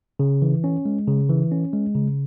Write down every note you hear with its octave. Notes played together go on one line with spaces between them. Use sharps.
C#3
E3
C#4
G#3
C#3
E3
C#4
G#3
C#3